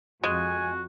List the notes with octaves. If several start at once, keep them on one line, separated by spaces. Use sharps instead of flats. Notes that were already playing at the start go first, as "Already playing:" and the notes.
F2 G#3 F#4 G#5